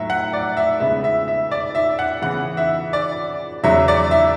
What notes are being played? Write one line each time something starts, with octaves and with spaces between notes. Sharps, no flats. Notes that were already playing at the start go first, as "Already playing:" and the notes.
Already playing: A2 F#3 E5
F#5
D5
E5
C#3 G#3 B3 E5
E5
E5
D5
E5
F#5
C#3 E3 B3 F#5
E5
D5
E2 C#3 F#3 E5
D5
E5